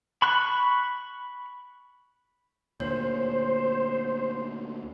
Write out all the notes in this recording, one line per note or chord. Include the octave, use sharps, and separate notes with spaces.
B5 C#6 F#6
D2 A#2 C5 C#5